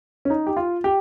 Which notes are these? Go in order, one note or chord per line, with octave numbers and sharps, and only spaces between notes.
C#4
D#4
G4
F4
G4